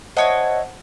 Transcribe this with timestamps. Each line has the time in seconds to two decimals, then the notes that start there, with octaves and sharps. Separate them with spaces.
0.17 E4 C5 C#5 D#5 F#5 A5